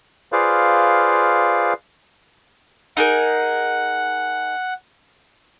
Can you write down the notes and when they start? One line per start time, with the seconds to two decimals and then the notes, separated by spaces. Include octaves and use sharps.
0.32 F4 G#4 B4 C5 D5 F5
2.97 D#4 G#4 A#4 F#5